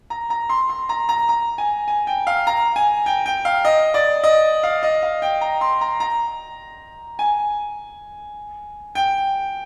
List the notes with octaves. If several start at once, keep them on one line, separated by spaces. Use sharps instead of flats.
A#5
A#5
C6
C6
A#5
A#5
A#5
G#5
G#5
G5
F5
A#5
G#5
G5
G5
F5
D#5
D5
D#5
F5
D#5
F5
G5
A#5
C6
A#5
A#5
G#5
G5